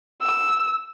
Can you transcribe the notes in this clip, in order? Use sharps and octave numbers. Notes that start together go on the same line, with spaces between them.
E6